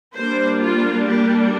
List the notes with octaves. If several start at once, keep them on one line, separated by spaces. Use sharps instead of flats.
G3 A#3 D4 C5
F4
G4